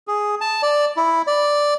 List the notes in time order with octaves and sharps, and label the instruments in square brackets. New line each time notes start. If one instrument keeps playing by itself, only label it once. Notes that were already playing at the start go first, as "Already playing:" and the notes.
[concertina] G#4
A5
D5
E4
D5